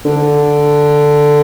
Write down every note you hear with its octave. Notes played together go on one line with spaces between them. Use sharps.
D3